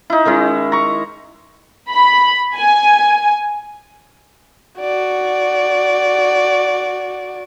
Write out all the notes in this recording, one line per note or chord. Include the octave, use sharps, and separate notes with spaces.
D#4 E4
D#3 G#3 C#4 E4
A#5 C#6
B5
G#5
F#4 D5